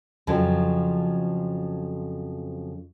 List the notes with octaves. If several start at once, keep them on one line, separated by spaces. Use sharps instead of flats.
F2 C#3 F3 F#3